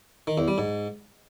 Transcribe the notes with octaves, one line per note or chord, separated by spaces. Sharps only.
D#3
E2
G3
G#2